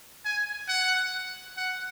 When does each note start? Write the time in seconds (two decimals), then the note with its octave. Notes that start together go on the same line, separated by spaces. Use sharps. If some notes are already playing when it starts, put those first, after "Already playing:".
0.25 G#5
0.68 F#5
1.57 F#5